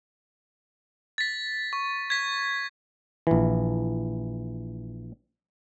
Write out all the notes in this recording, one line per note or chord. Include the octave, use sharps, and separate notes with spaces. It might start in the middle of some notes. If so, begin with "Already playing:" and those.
A6 B6
C#6
G#6 B6
A#1 E3